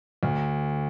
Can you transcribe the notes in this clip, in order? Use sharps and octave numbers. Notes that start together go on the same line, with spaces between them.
D2